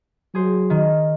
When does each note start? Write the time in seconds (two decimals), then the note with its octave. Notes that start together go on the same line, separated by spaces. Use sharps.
0.35 F#3 G#4 C5
0.70 D#3